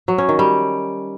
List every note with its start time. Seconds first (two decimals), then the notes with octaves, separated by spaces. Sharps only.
0.08 F#3
0.18 C#4
0.29 D#3
0.39 G3